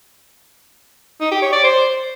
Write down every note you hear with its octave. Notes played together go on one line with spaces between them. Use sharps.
D#4
G4
C#5
D5
C5